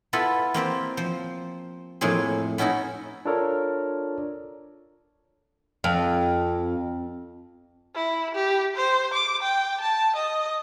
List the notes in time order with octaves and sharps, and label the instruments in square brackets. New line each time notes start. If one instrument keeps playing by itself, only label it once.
[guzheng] B3 E4 F4 A4 B4
A#3 C4 G4 C5
F3 C5
F2 A2 A#3 C4 G#4
B3 C#4 D#4 E4 F#4
[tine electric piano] D4 F4 A4 A#4 C#5 D5
[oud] F2
[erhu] E4
G4
C5
D6
G5
A5
D#5